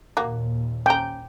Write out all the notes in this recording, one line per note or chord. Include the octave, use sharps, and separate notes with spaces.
D#2 A#2 A#3 F#4
C#4 G5 A#5